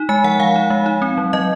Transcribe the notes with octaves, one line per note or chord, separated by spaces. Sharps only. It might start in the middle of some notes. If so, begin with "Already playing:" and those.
Already playing: D#4
G#3 G#5
F3 F#5
F3 F5
D#4
G#3
D#4
C4
F#3
F#3 D#5